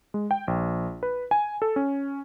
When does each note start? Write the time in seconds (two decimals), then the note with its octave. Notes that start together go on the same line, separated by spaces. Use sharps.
0.14 G#3
0.31 G5
0.48 A#1
1.03 B4
1.31 G#5
1.62 A4
1.76 C#4